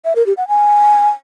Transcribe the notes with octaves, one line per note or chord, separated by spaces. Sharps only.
E5
A#4
G4
F#5
G#5